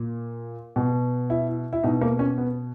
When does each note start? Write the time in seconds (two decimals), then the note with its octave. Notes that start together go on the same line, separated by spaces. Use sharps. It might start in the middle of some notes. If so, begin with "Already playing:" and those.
Already playing: A#2
0.76 B2
1.30 E4
1.73 E4
1.83 B2 D#4
2.01 A#3
2.19 C#4
2.38 B3